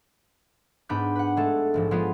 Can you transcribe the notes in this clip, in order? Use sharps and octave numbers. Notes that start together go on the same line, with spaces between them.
G#2 B3 D4 B5 G6
B4 F#5
G#3 A3 A4
A#1 G#2 F3
F3 G#3 B3 F4